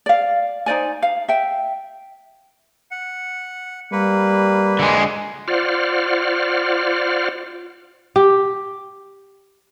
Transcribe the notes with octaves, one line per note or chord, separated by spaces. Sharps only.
D5 F5
D#4 C5 D5 G#5
F5
E5 G5
F#5
G3 A#3 B4
D3 G#3
F4 C5 D5 F#5 F6
G4